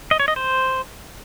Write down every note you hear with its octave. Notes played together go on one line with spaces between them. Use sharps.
D#5
C#5
D#5
C5